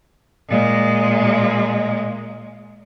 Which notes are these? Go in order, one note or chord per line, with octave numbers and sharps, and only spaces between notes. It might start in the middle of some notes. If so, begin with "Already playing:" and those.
A#2 G#3